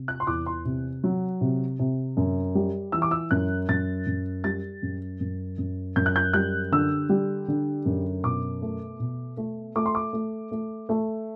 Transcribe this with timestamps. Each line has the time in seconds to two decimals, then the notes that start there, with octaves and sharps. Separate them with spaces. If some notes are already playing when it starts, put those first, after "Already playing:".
Already playing: C3
0.08 F#6
0.20 C6
0.27 E2 D6
0.46 C6
0.65 C3
1.04 F#3
1.41 C3
1.79 C3
2.17 F#2
2.55 G3
2.92 E3 E6
3.02 D6
3.11 E6
3.31 F#2 F#6
3.69 F#2 A6
4.07 F#2
4.44 G3 A6
4.82 F#2
5.20 F#2
5.58 F#2
5.96 F#2 G6
6.06 F#6
6.16 G6
6.33 G3 F#6
6.72 D3 E6
7.09 G3
7.48 D3
7.86 F#2
8.23 B2 D6
8.62 A3
9.00 B2
9.37 A3
9.76 A3 D6
9.86 C6
9.95 D6
10.13 A3
10.51 A3
10.89 A3